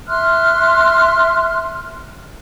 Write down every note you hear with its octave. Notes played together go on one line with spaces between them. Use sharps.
E5 C6 F6 F#6